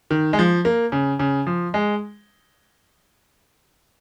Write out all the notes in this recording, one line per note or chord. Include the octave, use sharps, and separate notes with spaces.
D#3
G#3
F3
A#3
C#3
C#3
F3
G#3